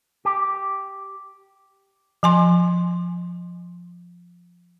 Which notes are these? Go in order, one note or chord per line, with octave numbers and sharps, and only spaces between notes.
G4
F3 G#5 C6